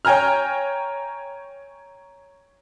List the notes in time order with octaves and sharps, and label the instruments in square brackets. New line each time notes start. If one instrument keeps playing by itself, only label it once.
[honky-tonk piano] C#5 G5 G#5 A#5 F6